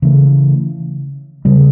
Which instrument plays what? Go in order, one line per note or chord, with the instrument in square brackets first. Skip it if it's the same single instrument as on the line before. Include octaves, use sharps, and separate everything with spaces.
[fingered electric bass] C#3 E3 A3
C#3 G3